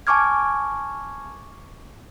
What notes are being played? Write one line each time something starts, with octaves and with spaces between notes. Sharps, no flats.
G#5 A5 C#6 D6 F6 G#6